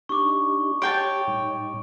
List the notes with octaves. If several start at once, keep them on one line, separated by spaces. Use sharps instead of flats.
D4 D#4 G4 C#6 D6
G4 C#5 G5 A5 D7
A2 G3 D#4